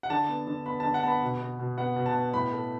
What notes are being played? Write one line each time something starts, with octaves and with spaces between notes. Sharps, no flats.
F#5
D3 A5
B3
D3
B3 B5
A5
D3
F#5
B3 A5 B5
B2
B3
B2
B3 F#5
B2
A5
B3
A2 B5
A3